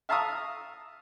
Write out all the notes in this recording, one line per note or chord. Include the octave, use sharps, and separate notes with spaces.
E5 F5 A5 A#5 C#6 D#6